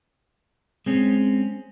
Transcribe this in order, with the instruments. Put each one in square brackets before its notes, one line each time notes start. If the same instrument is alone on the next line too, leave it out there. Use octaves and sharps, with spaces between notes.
[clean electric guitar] G#3 C4 C#4